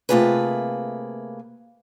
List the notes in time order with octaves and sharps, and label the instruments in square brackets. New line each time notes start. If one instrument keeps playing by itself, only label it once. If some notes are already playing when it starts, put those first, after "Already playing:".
[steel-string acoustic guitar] C3 A3 A#3 F4 G#4 B4